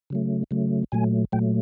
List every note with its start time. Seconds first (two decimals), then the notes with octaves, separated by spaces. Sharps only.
0.10 C#3 F#3 A3
0.51 C#3 F#3 A3
0.92 A#2 F#3 A3 G#5
1.32 A#2 F#3 A3 G5